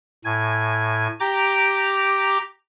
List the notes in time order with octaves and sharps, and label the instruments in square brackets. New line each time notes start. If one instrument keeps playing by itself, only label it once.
[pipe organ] A2 G#5
G4 G5 A#5 D6